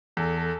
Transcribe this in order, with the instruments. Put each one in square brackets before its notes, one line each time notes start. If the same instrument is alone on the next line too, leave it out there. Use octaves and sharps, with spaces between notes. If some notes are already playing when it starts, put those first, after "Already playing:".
[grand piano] E2 [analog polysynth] A4